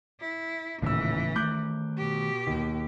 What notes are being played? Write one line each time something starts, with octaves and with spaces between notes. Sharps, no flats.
E4
D#1 A2 C#3 E3 E6
D#3 A3 D6 F#6 G6
B2 G4
D#2